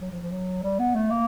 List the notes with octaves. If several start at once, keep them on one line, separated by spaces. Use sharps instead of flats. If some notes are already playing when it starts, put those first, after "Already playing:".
F#3
F3
F3
F#3
G3
B3
A3
A#3